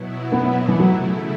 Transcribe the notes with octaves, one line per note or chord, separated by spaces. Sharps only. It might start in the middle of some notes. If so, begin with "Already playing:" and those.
Already playing: B2 F#3 B3 E4
B3
E3
C#3 F#3 A3 E4